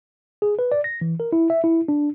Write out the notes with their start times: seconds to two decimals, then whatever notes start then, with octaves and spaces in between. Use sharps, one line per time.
0.42 G#4
0.59 B4
0.72 D5
0.84 A#6
1.01 E3
1.20 A#4
1.33 E4
1.50 E5
1.64 E4
1.88 D4